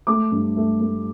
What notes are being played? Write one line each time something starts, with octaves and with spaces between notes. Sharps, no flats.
A3 D6
G2
A3
A3